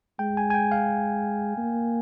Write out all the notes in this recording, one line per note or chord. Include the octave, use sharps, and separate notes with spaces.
G#3 G5
G#5
G#5
G5
F5
A#3